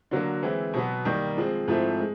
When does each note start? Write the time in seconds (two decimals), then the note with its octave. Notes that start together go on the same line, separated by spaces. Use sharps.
0.11 D3 F#3 A#3
0.43 E3 G#3 C4 E4
0.73 B2 F#3 B3
1.05 D#3 G3 A#3
1.37 F3 G#3 C4
1.68 G#2 F3 A3 C4 E4
1.99 G#3